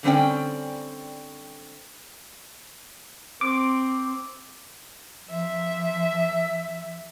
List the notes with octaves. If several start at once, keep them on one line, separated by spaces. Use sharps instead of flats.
D3 G3 C4 C#4 D5 G5
C4 D6
F3 E5